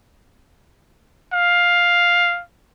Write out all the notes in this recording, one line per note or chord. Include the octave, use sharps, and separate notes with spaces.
F5